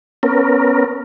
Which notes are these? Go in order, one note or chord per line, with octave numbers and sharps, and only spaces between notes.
B3 C#4 A#4